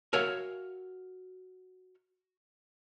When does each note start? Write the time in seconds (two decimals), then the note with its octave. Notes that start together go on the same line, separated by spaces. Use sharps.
0.13 F#4 A#4 C#5 E5 F5 G#5